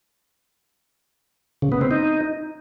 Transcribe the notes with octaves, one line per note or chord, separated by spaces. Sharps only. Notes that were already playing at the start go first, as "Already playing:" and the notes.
C#3
B3
C4
D#4